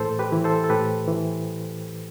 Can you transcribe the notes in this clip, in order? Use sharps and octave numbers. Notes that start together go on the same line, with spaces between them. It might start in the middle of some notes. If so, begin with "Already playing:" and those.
Already playing: A2 E3 A4 C5
G4 B4
E3
A4 C5
A4
A2 G4 B4
E3